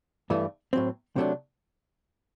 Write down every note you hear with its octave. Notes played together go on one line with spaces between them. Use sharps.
G2 E3 A3 E4
A2 F#3 C4
C3 F#3 A3 D4